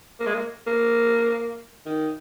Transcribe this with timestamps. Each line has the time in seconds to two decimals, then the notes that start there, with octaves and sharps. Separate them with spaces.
0.20 A#3
0.27 G#3
0.35 A#3
0.67 A#3
1.86 D#3